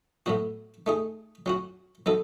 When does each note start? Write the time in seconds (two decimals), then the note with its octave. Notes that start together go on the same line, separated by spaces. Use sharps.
0.26 A2 F#3 B3 F#4
0.86 A3 D#4 G#4
1.46 F#3 C#4 F#4
2.06 F#3 B3 D#4 A4